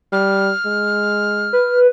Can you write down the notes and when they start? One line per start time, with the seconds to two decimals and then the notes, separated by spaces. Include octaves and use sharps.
0.13 G3 F6
0.65 G#3
1.53 B4